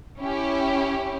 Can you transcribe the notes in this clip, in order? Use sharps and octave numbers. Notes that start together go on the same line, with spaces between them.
C#4 E4 G4